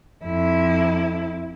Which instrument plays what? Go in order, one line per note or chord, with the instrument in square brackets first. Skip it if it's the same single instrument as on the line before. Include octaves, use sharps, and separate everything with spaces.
[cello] F2 E4